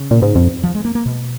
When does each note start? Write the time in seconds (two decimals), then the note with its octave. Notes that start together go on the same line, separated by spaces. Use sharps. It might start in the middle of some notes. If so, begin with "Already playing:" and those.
Already playing: C#3
0.11 A#2
0.22 G#2
0.35 F2
0.63 F3
0.75 G#3
0.85 A#3
0.95 A#3
1.06 B2